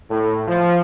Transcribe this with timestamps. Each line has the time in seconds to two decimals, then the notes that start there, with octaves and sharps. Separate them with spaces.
0.10 A2
0.47 F3